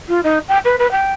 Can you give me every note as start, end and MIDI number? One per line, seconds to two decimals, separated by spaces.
0.08 0.20 65
0.23 0.39 63
0.48 0.58 79
0.64 0.75 71
0.79 0.90 71
0.91 1.13 79